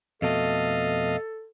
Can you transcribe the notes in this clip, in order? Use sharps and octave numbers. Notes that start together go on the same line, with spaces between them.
F2 B2 A3 A4 D#5 F5